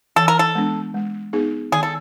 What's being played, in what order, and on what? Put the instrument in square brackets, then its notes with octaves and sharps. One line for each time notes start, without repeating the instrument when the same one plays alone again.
[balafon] E3 [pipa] A4
[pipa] A#4
A4
[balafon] G#3 B3 D4
G#3
B3 D#4 G#4
[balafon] D#3 [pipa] G#4
[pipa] A4